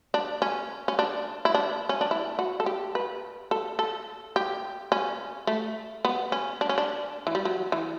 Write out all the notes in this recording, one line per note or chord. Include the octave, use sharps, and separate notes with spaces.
D4
C#4
C#4
D4
E4
D4
C#4
D4
E4
F#4
A4
G4
B4
A4
A4
G4
C#4
A3
B3
C#4
D4
C#4
D4
E3
G3
F#3
E3